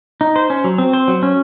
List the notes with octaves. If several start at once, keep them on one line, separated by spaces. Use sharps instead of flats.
D#4
C5
C#4
F#3
C4
C5
F#3
C#4